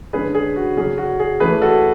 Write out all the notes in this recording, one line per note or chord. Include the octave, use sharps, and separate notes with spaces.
D3 G#3 C#4 G#4 B4
G#4
F#4
C#3 F#3 C#4 G#4
F#4
G#4
E3 A3 C#4 G#4 B4
F#4 A4